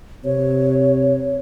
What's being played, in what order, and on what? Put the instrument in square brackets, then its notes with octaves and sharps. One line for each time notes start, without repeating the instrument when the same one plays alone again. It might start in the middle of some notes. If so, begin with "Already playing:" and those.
[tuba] C3 [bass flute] C#5